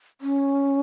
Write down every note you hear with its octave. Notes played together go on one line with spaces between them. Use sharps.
C#4